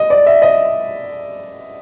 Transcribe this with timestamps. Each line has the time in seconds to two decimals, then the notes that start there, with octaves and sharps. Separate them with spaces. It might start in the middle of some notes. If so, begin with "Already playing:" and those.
Already playing: D#5
0.10 D5
0.26 E5
0.42 D#5